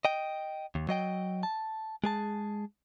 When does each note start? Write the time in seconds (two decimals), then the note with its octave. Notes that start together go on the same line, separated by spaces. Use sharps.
0.05 D#5 G5
0.75 D#2
0.89 F#3 D#5 G5
1.43 A5
2.04 G#3 G#4 A5